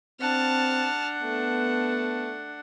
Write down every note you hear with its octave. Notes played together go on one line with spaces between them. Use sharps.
C4 D4 F#5 A5 F6
A3 B3